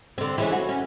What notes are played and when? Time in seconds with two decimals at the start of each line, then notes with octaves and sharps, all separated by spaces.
0.18 D3 C4
0.38 E3 G#3 C#4
0.52 F#4
0.69 C#4